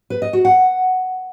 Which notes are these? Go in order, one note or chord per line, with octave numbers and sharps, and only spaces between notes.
B4
D#5
F#4
F#5